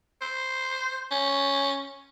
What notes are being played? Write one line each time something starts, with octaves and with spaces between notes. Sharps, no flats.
C5
C#4